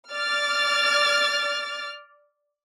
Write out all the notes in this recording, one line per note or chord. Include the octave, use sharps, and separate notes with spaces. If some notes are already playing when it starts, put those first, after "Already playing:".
D5 F6 A6